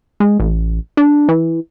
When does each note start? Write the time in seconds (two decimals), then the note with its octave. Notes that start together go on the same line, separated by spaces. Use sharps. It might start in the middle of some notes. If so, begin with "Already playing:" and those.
0.20 G#3
0.40 A1
0.97 D4
1.29 E3